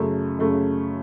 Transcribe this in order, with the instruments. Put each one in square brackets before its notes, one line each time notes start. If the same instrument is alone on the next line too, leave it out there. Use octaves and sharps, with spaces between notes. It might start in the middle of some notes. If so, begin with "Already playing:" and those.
Already playing: [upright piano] F#2 C#3 A3
F#2 C#3 A3